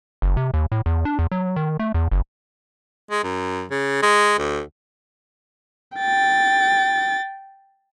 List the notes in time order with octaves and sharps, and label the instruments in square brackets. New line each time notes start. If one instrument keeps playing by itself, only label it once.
[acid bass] F#1
C3
D#2
A2
E2
D4
E2
F#3
D#3
A3
E2
F#1
[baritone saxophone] G#3
F#2
C#3
G#3
D2
[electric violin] G5 A6